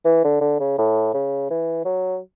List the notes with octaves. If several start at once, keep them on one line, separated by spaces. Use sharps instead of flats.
E3
D3
D3
C#3
A2
C#3
E3
F#3